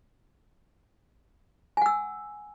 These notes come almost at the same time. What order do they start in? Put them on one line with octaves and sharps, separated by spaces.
G#5 F#5 E6